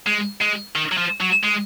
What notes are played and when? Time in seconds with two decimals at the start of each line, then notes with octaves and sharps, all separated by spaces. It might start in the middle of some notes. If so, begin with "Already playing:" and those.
0.06 G#3
0.41 G#3
0.75 D#3
0.92 F#3
0.98 F3
1.21 F#3
1.44 G#3